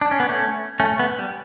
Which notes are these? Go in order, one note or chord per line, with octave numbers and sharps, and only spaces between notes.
D4
C#4
B3
A3 C#4
A3 C#4
B3
G3